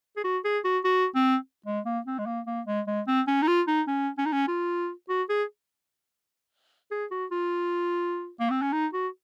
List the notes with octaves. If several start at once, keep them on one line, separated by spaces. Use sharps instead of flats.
G#4
F#4
G#4
F#4
F#4
C4
G#3
A#3
C4
G#3
A#3
A#3
G#3
G#3
C4
C#4
D#4
F4
D#4
C#4
C#4
D#4
C#4
F4
F#4
G#4
G#4
F#4
F4
A#3
C4
C#4
D#4
F#4